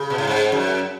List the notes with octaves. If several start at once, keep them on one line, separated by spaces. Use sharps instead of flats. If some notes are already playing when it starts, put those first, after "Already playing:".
Already playing: C#3
B2
A2
G#2
F#2